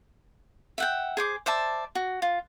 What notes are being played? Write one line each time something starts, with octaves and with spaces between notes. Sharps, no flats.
E5 F#5 G5
G#4 C5 D6
C5 D5 E5 A5
F#4
F4